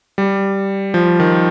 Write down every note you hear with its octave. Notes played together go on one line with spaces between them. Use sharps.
G3
F3
D#3